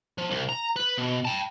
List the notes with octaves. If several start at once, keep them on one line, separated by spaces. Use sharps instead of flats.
F3
C2
A#5
B4
B2
G5 A5